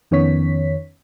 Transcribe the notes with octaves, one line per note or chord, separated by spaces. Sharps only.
F2 D#3 B3 C#4 C#5 B6